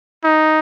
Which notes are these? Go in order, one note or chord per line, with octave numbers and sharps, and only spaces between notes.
D#4